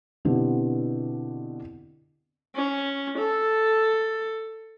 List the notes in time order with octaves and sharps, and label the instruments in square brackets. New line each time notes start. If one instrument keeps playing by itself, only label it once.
[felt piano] B2 D3 B3 C4 E4 G4
[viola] C#4
A4